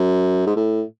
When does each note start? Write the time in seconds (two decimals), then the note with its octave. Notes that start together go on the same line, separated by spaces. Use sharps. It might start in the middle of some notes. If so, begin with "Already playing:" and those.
Already playing: F#2
0.47 G#2
0.56 A2